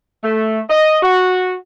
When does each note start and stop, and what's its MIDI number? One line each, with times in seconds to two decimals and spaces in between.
0.24 0.60 57
0.70 0.99 75
1.03 1.55 66